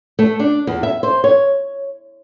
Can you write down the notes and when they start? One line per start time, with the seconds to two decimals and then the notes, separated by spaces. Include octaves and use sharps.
0.19 A3
0.39 D4
0.67 E2
0.83 E5
1.03 C5
1.24 C#5